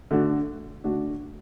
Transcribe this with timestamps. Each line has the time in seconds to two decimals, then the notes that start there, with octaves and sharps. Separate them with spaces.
0.11 D3 A3 D4 F#4
0.84 D3 A3 D4 F#4